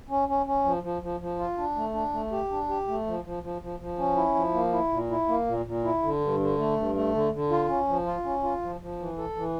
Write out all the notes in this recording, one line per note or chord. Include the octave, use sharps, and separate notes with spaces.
C#4
C#4
C#4
F3
F3
F3
F3
F4
D4
A3
D4
A3
G4
D4
G4
A3
F3
F3
F3
F3
F3
C#4
E4
F3
A#3
E4
A#2
E4
A#3
A#2
A#2
E4
D3
G2
D3
A3
G2
A3
D3
D3
F4
C#4
F3
F4
C#4
F4
F3
F3
E3
A4
E3